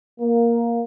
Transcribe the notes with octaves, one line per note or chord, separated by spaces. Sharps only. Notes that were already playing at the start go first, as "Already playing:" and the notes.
A#3